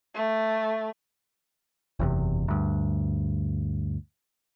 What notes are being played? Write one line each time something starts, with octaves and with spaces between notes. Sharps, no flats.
A3
F#1 E2 C3
D2 G2